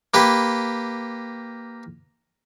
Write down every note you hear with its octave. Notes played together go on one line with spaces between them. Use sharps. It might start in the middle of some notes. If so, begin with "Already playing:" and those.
A#3 G4 B4